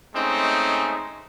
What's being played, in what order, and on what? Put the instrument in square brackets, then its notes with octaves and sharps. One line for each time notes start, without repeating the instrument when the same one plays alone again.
[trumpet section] G#3 A3 C4 C#4 D#4